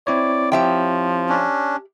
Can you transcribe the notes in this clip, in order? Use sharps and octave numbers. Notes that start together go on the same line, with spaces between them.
C4 E4 C#5 D5
F3 G4 E5 G5
C#4 D4